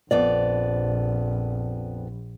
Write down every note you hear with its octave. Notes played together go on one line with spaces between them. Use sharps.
A#1 F2 B3 D5